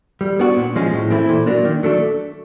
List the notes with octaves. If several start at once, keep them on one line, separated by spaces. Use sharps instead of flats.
G3
B3 D4 F#4
A#2
F3 G#3 C#4
A2
E3 A3 C4 E4
A#2
F#3 A#3 D4
D#3
F#3 A3 D4